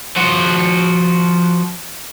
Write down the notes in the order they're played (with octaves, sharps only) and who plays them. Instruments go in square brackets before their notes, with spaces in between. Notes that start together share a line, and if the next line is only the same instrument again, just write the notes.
[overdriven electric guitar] F3 F#4